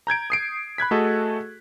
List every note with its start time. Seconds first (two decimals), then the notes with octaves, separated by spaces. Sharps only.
0.07 A#5 G6 G#6 D7
0.30 D#6 C7 D7
0.78 B5 F#6 G#6 B6
0.91 A3 F#4 G#4 A4 D#5